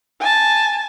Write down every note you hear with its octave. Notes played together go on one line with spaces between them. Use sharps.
G#5 A5